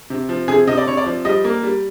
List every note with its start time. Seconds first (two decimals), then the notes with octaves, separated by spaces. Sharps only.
0.10 C3
0.29 F3
0.48 C3 G#4
0.67 C3 D#5
0.77 D5
0.87 C3 C#5
0.97 D5
1.06 F3
1.25 G3 D#5
1.44 A#3
1.63 G3